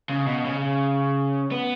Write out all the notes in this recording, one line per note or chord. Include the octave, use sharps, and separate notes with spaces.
C#3
B2
C#3
B3